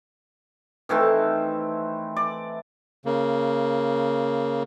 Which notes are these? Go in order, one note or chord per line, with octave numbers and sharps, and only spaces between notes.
D#3 E3 A3 C4
D5
C#3 A#3